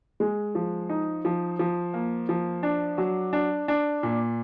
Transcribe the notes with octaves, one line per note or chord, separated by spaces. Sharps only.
G#3
F3
D#4
F3
F3
A#3
F3
D4
F#3
D4
D4
A#2